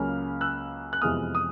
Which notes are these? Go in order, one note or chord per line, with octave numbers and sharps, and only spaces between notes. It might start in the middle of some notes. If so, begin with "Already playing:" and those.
Already playing: C#2 C#3 F#3 A#3 C#4 F6
E6 F#6
F#6
F2 C3 E3 G#3 B3 D#6 F6
D#6